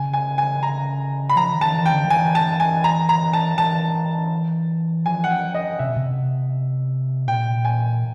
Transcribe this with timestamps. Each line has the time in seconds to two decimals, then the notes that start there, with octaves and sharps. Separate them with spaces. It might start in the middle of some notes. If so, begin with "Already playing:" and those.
Already playing: C#3 G#5
0.13 G#5
0.38 G#5
0.63 A#5
1.30 B5
1.36 F3 A#5
1.55 D#3
1.61 A5
1.74 E3
1.86 G5
1.92 D3
2.05 F3
2.10 E3 G#5
2.35 A5
2.60 G#5
2.84 A#5
3.09 A#5
3.33 A5
3.58 E3 A5
5.06 F3 G#5
5.24 F#5
5.31 G5
5.54 D#5
5.79 C3 E5
5.88 B2
5.97 C3
7.28 A#2 G5
7.65 G#5